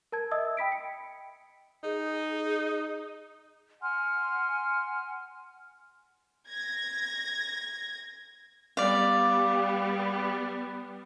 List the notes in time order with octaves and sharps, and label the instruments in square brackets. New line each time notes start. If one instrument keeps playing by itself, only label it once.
[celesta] A#4 A5 G#6
D#5 E5 D#6 E6
G5 B5 B6 D7
C#7
[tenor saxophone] D#4 [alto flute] G#4
[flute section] F#5 G#5 C6 F6
[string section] G#6 A#6
[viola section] G3 B3 [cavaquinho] D5 F5